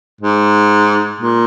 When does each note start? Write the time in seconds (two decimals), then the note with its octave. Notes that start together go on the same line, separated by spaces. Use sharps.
0.21 G#2
1.21 A#2